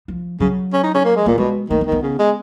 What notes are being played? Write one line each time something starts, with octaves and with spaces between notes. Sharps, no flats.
F3
C#3 F#3
C#4
D#4
C#4
A#3
G#3
A#2 A#3
B2 G#3
D#3 A#3
B3
D#3
B3
C#3
G#3